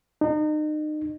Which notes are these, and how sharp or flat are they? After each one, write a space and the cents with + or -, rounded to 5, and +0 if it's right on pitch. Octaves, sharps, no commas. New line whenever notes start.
D#4 -35